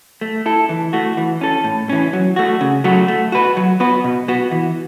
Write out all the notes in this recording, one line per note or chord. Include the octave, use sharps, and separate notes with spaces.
A3
E4 A4
E3
A3 F#4
E3
C#4 A4
A2
E3 C#4
F#3
A3 F#4
C#3
F#3 A3 F#4
A3
F#4 B4
F#3
B3 F#4 B4
B2
B3 F#4
E3